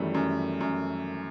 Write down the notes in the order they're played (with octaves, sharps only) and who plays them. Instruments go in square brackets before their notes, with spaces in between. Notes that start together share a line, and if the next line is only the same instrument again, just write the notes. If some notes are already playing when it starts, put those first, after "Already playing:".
Already playing: [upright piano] F#2 [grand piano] D#3 E3 F#3 G3 A3
[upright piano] F#2
F#2